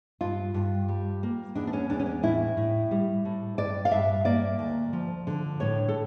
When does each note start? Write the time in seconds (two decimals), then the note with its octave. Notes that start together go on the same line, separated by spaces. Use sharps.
0.21 G2 F4
0.54 G2
0.88 G3
1.23 A#3
1.55 E2 D4
1.67 D4
1.73 C#4
1.90 E2 D4
2.00 C#4
2.06 D4
2.23 A2 E4
2.57 A2
2.91 G3
3.25 A2
3.58 G2 D5
3.85 F5
3.91 G2 E5
4.25 A#3 D5
4.59 D2
4.93 F3
5.27 D3
5.60 A2 C#5
5.88 A4